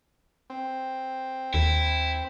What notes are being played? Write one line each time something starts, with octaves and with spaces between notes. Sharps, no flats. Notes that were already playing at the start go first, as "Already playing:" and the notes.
C4
D#2 E4